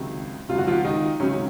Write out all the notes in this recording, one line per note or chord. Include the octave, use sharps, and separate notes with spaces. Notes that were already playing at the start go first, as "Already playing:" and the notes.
Already playing: C#2 C3 D#3 F#3
C#2 C3 D#3 F#3 F4
F#4
F3 F4
D#3 D#4
C#2 C3 D#3 F#3 C#4